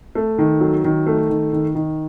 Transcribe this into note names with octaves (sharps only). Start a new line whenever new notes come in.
A3
D#3
F#3
D#3
A3
D#3
D#3
D#3